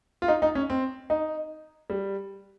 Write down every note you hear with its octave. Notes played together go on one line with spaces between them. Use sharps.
F4
D#4
D#4
C#4
C4
D#4
G3